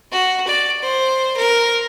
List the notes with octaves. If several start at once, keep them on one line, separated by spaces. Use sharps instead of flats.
F#4
D5
C5
A#4